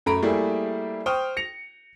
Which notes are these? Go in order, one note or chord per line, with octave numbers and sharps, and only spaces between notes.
F#2 A3 A#5 B5 D7
G3 A3 A#3 E4 G#4
C5 G5 C#6 D#6 F6
A#6 C#7 F7